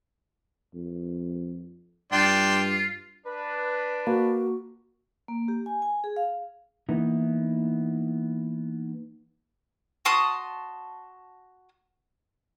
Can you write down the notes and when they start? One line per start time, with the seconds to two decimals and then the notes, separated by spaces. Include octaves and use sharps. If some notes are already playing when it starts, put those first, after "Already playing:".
0.74 F2
2.12 G2 D4 F4 G5 C6
3.26 D4 B4
4.07 A#3 F#4
5.28 A#3
5.48 G4
5.66 G#5
5.82 G#5
6.04 G#4
6.16 F5
6.89 E3 A#3 B3 D#4 E4
10.05 F#4 A5 C6 D#6